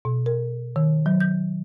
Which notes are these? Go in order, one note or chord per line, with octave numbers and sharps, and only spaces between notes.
B2
A#4
D#3
F#3
G6